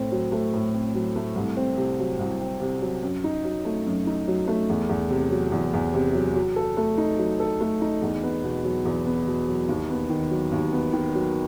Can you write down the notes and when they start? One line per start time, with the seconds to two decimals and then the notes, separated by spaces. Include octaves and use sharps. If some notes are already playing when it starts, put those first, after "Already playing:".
Already playing: A2 C4
0.12 F#3
0.32 A3
0.53 A2
0.74 C4
0.95 F#3
1.16 A3
1.36 C2
1.57 C4
1.77 C3
1.99 F#3
2.19 C2
2.41 C4
2.61 C3
2.82 F#3
3.03 F#2
3.24 D#4
3.44 F#3
3.65 A3
3.86 F#2
4.07 D#4
4.28 F#3
4.48 A3
4.70 E2
4.89 E2
5.10 C3
5.31 F#3
5.52 E2
5.74 E2
5.94 C3
6.14 F#3
6.36 F#3
6.56 A4
6.77 A3
6.98 D#4
7.18 F#3
7.40 A4
7.61 A3
7.81 D#4
8.02 E2
8.23 B3
8.44 B2
8.64 F#3
8.85 E2
9.05 B3
9.27 B2
9.48 F#3
9.69 D#2
9.90 B3
10.10 D#3
10.31 F#3
10.52 D#2
10.73 B3
10.93 D#3
11.15 F#3